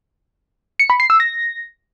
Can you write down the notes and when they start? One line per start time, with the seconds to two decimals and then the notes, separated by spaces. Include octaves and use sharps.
0.80 C#7
0.90 B5
1.00 C7
1.10 E6
1.20 A#6